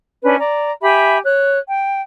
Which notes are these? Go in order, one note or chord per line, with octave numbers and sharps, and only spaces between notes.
C#4 D4 B4
D5 A#5
G4 E5 G#5 B5
C#5 F#6
G5